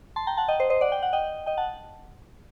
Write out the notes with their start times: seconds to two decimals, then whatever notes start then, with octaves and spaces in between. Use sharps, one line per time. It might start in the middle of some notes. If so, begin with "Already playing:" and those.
0.16 A5 C6
0.27 G5 A#5
0.37 F#5 A5
0.48 D#5 G5
0.60 C5 D#5
0.70 C5 D#5
0.81 D5 F#5
0.92 G5
1.02 F#5
1.13 D#5 G5
1.46 D#5 G5
1.57 F#5 A5